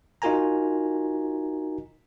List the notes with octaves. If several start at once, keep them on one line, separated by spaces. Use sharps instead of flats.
D#4 F4 F#4 A#4 G#5 A#5